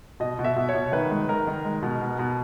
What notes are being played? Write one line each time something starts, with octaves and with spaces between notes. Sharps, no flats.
B2 D#5
B2
E5
B2
C#5
B2
D#3 B4
G#3
D#3 A#4
D#3
G#3
B2
B3
B2